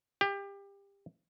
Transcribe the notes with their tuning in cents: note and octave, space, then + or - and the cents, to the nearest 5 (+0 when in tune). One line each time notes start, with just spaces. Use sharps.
G4 +25